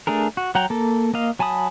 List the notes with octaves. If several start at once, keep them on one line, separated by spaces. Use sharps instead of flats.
A3 D4 G#4 A#4
F#4
F#3 F#5 G5 A#5
A#3 A4
A#3 D#5 F5
F#3 G#5 A5 B5 D#6